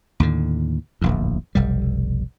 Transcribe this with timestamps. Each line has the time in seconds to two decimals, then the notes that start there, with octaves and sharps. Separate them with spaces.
0.20 D#2 A2 D3
1.01 D1 A#1 E2
1.55 F1 B1 G3